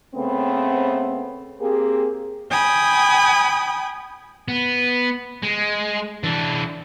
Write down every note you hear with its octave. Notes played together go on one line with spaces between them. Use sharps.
C#3 A3 B3 C4
A#3 C4 G4 G#4
G5 G#5 B5 D#6
B3
G#3
E3 D4